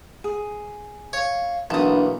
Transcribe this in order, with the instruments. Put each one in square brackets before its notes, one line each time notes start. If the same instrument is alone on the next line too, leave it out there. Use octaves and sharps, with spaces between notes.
[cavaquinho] G#4
[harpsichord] C#5 [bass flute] F5
[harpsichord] B1 [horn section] E3 A#3 B3 [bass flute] D4 [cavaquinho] A5 D#6